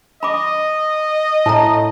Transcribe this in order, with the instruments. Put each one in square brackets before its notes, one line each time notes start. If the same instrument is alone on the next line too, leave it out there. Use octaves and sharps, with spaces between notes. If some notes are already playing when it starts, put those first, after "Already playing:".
[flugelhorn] D#5 [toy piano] B5 D6
[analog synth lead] A2 [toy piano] A5 A#5